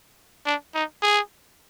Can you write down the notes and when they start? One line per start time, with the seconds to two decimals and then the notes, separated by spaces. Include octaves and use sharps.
0.46 D4
0.75 D#4
1.02 G#4